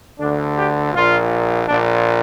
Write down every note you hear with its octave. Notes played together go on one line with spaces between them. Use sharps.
D2 D3 D4
G4
A#1 A#2 F4
A#1 A#2 D4